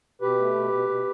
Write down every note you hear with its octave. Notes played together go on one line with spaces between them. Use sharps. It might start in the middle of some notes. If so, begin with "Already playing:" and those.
B2 G4 B4
A3
B2
B2
B2